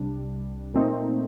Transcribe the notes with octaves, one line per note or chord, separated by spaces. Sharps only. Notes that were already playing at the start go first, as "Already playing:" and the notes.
Already playing: C2 C3 G3 D4
A#2 A3 C4 D#4